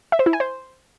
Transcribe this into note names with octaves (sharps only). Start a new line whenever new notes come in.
E5
C5
E4
G#5
C5